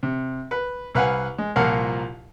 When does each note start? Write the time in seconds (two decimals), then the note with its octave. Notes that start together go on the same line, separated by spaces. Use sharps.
0.03 C3
0.51 B4
0.95 C2 B4 F5 F#5 G#5
1.38 G#3
1.56 C2 A#2 F3 A#4 F5 F#5